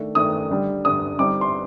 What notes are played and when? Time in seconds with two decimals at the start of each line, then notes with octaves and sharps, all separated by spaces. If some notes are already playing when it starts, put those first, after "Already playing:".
Already playing: D#3 A3 D4
0.15 D#3 A3 D4 D#6
0.51 D3 G3 D4
0.85 D3 G3 D4 D#6
1.18 D3 G3 C4 D#4 D6
1.41 C6